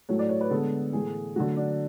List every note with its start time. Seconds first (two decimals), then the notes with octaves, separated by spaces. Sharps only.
0.09 A2 F#3 A3 C#5
0.19 D5
0.29 C#5
0.41 B4
0.50 D3 G#3 B3 A4
0.93 A2 E3 A3 G#4
1.36 D3 F#3 A3 F#4
1.57 D4